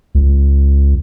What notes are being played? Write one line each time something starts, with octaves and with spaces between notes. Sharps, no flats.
C#2